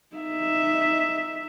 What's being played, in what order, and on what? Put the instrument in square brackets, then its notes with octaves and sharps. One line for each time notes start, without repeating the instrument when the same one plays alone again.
[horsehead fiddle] D#4 E5